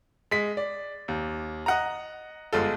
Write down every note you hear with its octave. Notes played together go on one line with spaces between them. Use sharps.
G#3 B6
D5
D#2
D#5 F#5 A#5
G1 G#3 F4 A4